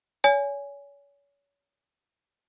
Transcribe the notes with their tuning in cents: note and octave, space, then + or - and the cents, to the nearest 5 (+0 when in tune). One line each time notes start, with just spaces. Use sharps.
C#5 +35 G#5 +0